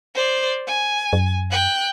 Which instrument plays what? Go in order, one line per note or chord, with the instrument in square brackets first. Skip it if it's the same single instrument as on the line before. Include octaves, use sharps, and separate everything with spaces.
[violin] C5 D5
G#5
[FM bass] F#2
[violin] G5 F#6